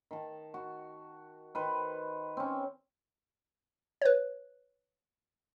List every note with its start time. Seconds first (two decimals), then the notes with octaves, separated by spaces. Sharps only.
0.11 D#3 A5
0.54 F#4
1.55 D#3 B4 C5
2.37 C4 C#4
4.02 B4 C#5